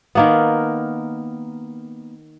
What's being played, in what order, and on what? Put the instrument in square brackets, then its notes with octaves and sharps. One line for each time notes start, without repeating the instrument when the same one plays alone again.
[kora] D#3 A#3 B3